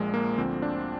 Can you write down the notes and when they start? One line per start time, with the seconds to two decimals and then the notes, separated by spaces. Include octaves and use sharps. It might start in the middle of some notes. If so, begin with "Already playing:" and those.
Already playing: A#1 A#2 F3 G#3
0.14 A#3
0.37 D2 D3 F3 C4
0.62 D4